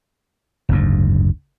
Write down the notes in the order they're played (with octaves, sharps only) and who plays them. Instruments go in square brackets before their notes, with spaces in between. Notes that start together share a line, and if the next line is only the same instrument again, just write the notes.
[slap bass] F#1 D2 G#2